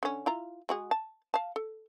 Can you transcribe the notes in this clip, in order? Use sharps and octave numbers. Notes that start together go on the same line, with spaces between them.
D3 C#4
E4 F4 A#5
G#3 F#4 G#4
A5
F5 A5
A4